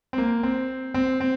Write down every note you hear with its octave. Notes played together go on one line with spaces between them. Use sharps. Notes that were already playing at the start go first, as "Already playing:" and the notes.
C4
A#3
C4
C4
C4